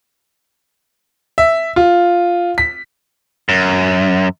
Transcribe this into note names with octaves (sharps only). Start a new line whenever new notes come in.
E5
F4
B6
F#2